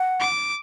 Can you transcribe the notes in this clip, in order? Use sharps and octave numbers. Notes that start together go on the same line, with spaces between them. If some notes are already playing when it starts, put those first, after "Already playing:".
Already playing: F#5
D6